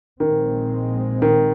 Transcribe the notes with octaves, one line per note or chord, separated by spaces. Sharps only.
A#1 A#2 D#3 G#3 C4
D#3